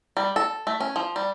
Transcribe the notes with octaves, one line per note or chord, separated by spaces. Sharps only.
G3
A4
A3
C#4
F3
G3